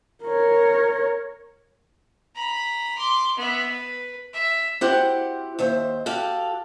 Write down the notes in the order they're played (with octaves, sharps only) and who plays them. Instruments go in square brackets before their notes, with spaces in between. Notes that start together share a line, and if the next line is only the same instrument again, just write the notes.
[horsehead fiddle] A#4 C#5
[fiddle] A#5 B5
C6 D6
B3 E5
B4
E5
[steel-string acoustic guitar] C4 E4 F#4 G4 C5 F#5
D#2 C5 E5
F#4 G4 A4 F5